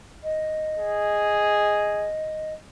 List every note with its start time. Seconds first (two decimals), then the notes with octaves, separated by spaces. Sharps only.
0.23 D#5
0.79 G#4